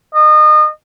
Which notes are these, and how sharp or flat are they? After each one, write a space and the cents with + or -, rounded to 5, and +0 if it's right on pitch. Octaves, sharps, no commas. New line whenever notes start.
D#5 -30